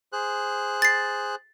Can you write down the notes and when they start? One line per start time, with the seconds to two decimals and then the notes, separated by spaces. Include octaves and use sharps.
0.13 G#4 C5 F#6
0.82 A6 C7